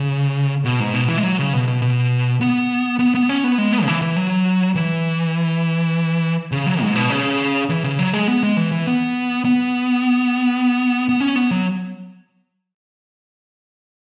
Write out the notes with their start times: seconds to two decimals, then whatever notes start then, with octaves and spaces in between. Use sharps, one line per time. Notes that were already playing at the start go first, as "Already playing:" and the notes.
Already playing: C#3
0.65 B2
0.80 G#2
0.94 B2
1.09 E3
1.18 G#3
1.23 F#3
1.39 C#3
1.53 B2
1.68 B2
1.82 B2
2.41 B3
2.99 B3
3.15 B3
3.29 C#4
3.44 B3
3.58 G#3
3.72 B3
3.83 C#3
3.88 E3
4.02 E3
4.16 F#3
4.75 E3
6.52 C#3
6.66 F#3
6.81 G#2
6.95 B2
7.10 C#3
7.69 E3
7.84 C#3
7.99 F#3
8.13 G#3
8.28 B3
8.43 G#3
8.57 E3
8.72 E3
8.87 B3
9.45 B3
11.09 B3
11.20 C#4
11.36 B3
11.51 F#3